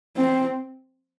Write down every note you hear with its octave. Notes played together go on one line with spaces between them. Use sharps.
C4